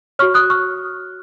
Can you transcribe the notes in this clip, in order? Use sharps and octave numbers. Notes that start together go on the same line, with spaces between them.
F#4 C#5 C#6 F6
D#6 F#6
C#6 F6